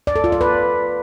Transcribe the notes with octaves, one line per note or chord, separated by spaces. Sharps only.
D5
A4
F4
D5
B4